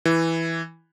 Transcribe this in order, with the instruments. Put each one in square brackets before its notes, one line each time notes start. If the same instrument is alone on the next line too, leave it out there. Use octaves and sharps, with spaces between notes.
[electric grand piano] E3